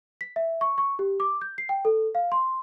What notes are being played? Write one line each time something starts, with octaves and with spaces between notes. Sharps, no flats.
B6
E5
C#6
C#6
G4
D6
G6
C7
G5
A4
F5
C6